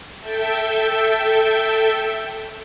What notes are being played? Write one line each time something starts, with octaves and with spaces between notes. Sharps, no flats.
A4 E5 G5